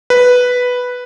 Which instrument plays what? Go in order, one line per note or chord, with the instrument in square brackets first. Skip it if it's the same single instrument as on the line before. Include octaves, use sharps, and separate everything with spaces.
[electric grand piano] B4